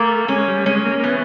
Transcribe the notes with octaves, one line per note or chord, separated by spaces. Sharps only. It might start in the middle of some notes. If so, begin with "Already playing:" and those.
Already playing: A3 A#3
G#3 C#4
G3
G#3 C#4
A#3
A#3
E3 B3